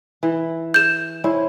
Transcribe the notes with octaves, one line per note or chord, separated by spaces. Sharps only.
E3
G6 E7
C#4 E4 C5